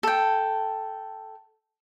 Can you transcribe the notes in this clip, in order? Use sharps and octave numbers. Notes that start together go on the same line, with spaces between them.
A4 G5